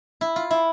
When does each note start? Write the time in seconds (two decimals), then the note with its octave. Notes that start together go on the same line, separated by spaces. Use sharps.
0.21 E4
0.36 F4
0.51 E4